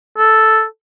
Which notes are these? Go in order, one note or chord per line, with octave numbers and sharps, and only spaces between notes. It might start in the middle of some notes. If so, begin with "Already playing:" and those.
A4